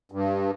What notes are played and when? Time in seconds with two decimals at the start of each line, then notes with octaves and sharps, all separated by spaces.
0.12 G2